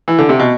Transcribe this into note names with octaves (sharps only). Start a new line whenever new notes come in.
E3
D3
C3
B2